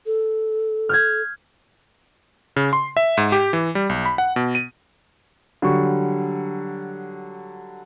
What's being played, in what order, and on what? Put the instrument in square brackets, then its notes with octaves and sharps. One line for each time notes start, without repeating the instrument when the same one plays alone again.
[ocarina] A4
[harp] F6 G6 G#6
[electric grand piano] C#3
C6
E5
G#2
G4
E3
G3
B1
B5
F#5
B2
D#7
[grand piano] D3 F#3 G3 C#6